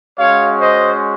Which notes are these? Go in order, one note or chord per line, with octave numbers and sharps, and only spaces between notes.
G#3 C#4 F#4 C#5 F5
C5 D#5